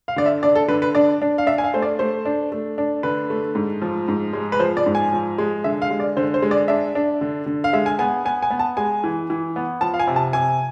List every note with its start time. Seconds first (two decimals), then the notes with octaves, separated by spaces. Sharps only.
0.08 F5
0.16 D3 D5
0.26 E5
0.43 D4 D5
0.55 A4
0.68 D3 B4
0.82 B4
0.95 D4 D5
1.22 D4
1.38 F5
1.47 D4 E5
1.58 G#5
1.64 F5
1.74 A3 C5
1.82 D5
1.99 A3 C5
2.25 D4
2.52 A3
2.78 D4
3.03 D3 B4
3.30 A3
3.55 G#2
3.82 F3
4.08 G#2
4.33 G#3
4.52 B4
4.59 F3 C5
4.77 D5
4.86 G#2
4.95 G#5
5.13 F3
5.38 G#3
5.64 D3 E5
5.82 F5
5.91 G#3
6.00 D5
6.17 D3 C5
6.34 C5
6.42 G#3
6.51 D5
6.68 D4 E5
6.95 D4
7.21 D3
7.46 D3
7.64 F5
7.73 G#3 E5
7.86 G#5
7.99 B3 G#5
8.25 B3 G#5
8.43 G#5
8.51 B3
8.60 A5
8.77 G#3 G#5
9.04 E3
9.30 E3
9.56 B3
9.81 F3 A5
9.94 F5
10.00 G#5
10.07 C3
10.16 A5
10.33 C3 G#5